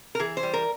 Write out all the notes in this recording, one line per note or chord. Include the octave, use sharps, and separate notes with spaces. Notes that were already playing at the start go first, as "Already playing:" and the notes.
A#4
E3 G#4
C5
G3
A#4